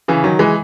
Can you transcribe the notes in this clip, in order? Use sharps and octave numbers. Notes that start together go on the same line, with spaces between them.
C#3 E3
D#3 F#3
E3 G#3